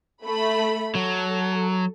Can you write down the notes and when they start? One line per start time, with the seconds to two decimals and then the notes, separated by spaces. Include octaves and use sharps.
0.25 A3 B5
0.95 F#3 A4